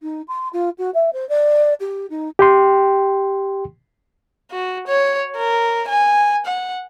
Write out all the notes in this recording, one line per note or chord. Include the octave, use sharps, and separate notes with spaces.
D#4
C6
F4
F#4
E5
C5
D5
G4
D#4
G4 G5 C6
F#4
C#5
A#4
G#5
F#5